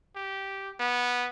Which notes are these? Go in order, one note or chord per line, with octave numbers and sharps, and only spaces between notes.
G4
B3